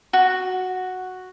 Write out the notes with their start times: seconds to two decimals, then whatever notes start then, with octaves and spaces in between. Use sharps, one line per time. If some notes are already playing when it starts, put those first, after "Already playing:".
0.13 F#4